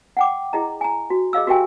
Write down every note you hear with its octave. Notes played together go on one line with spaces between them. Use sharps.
F#5 G5 D6
E4 G#4 D#5 A#5
G#5 A#5
F#4
G#4 D#5 F5 E6
F#4 G4 A#4 E5 G5 G#5